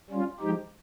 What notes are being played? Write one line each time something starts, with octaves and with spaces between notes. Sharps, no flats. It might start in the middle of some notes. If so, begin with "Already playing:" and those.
G3 C#4 F4
F3 G#3 D#4 G4